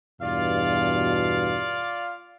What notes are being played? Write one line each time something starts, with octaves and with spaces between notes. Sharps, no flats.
E2 G2 B2 F4 D5 F5